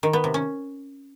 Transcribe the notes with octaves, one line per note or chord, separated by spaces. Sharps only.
D#3
B3
C3
C#4